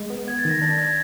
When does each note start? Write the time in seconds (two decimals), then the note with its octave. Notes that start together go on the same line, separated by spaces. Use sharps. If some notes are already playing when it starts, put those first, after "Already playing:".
Already playing: G#3
0.10 B3
0.27 B3 G#6
0.39 A6
0.45 D#3 A#6
0.61 D4 A6
0.78 D4 G#6